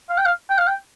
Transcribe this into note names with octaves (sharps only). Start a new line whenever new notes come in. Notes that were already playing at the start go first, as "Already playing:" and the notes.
F5
G5
F5
G5
F5
G5